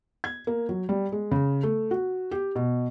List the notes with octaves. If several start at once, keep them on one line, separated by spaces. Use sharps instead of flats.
G#6
A#3
F#3
G3
G#3
C#3
A3
F#4
G4
B2